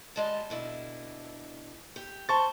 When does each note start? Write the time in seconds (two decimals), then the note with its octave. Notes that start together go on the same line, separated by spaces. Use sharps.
0.16 G3 G#3 A5
0.50 B2 D3 E4
1.96 G4
2.29 C5 A5 C#6 A6